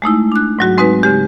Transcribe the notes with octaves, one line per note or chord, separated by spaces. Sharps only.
G#3 A3 D#4 E4
D4 F#6
G#2 F#3 F#4
G#3 C4 D#4 F#4 B4
C#3 G#3 G4